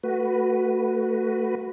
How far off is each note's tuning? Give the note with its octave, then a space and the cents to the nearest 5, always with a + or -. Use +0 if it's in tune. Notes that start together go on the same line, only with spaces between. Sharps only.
A3 +15 F#4 +0 B4 +0